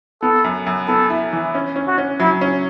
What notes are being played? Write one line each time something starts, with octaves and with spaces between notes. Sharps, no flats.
B3 A4
F#2
F#2
B3 A4
E4
E3
C#4
C#4
F#4
C#4
F#3 E4
C#4